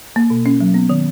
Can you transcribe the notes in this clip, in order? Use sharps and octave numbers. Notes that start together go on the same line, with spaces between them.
A#3
B2
C#4
F#3
B3
D#3